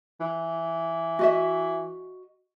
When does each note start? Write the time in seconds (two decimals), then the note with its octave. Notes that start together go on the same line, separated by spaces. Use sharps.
0.20 E3
1.19 F#4 D#5 E5